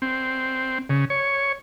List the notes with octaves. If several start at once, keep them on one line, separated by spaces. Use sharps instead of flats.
C4
C#3
C#5